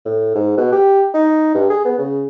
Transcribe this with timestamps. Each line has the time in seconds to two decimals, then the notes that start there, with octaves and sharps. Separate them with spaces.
0.05 A2
0.35 G#2
0.58 B2
0.72 G4
1.14 D#4
1.55 G2
1.70 G#4
1.85 B3
1.98 C#3